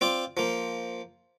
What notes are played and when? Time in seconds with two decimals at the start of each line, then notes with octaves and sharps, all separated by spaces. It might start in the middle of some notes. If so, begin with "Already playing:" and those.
0.01 C4 F4 D5
0.37 F3 A#3